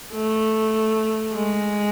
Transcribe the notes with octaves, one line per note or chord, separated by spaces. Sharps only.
A3
G#3